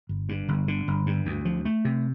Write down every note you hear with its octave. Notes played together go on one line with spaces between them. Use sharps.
G1
G2
G1
D3
G1
G2
D2
F3
A3
C3